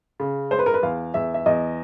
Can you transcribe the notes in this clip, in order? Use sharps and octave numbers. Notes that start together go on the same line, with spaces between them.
C#3
G#3 C5
B4
A#4
B4
E2 F5
E2 E5
E5
E2 D#5